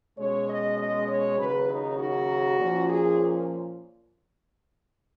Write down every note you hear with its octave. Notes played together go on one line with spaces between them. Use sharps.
B2 G#3 C#4 C#5
D#5
D#5
C#5
D#2 C#3 F#3 A#3 B4
D#4
F#4
A#2 F3 A#3 C#4
G#4